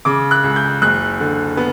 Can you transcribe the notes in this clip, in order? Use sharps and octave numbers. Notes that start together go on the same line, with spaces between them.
C#3 D6
F#6
C#2
G6
F#1 F#6
D3
B3